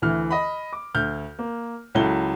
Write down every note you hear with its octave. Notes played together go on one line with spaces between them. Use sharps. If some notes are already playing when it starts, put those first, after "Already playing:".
D2 E3 F6
D#5 B5
D6
D2 F6 G6
A#3
C#2 F#3 E4 A4 G7